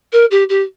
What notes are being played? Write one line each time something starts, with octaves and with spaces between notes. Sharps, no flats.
A#4
G4
G4